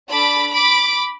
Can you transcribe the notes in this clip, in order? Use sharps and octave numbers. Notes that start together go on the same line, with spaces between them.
D4 A4 B5 D6
B5 D6